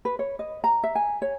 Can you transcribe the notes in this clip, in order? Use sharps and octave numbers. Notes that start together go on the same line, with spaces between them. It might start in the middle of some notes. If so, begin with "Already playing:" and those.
B4
C#5
D#5
A#5
E5
G#5
C#5